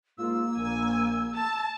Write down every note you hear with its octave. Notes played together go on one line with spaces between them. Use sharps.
G#2 A#3 F4 E6
A#1 G#5
A5 E6